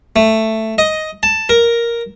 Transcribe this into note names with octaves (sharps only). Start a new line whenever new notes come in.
A3
D#5
A5
A#4